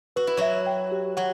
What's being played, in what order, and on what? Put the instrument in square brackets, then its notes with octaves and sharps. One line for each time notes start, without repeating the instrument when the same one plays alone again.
[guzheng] F#4 [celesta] B4
[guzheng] E4
[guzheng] F#3 F#4 [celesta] E5
[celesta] G5
G4
[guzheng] F#3 F#4 [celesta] F#5